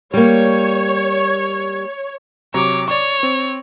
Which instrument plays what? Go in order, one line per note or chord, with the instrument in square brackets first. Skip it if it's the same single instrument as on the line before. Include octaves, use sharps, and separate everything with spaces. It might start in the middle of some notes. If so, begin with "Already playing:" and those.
[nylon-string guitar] G3 A#3 [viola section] C#5
[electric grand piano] C3 F#3 A#5 [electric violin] C#5 D6
[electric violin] C#5 [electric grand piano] D5 C#6
[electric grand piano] C4